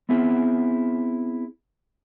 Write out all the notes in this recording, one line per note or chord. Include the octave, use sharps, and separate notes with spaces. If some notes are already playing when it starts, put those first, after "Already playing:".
B3 C4 E4 G#4